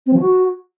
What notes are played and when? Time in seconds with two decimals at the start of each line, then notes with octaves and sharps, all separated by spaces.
0.06 C4
0.13 F3
0.20 F#4